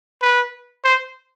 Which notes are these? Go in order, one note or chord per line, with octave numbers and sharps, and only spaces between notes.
B4
C5